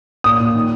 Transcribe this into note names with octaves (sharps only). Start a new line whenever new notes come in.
A#2 D#6
A#2
D#3